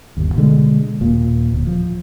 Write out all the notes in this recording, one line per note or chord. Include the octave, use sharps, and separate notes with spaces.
G1 D#2
B2 D3 G#3
D#1 A#2
D1
F3